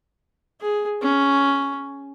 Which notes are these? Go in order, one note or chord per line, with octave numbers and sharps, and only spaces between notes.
G#4
C#4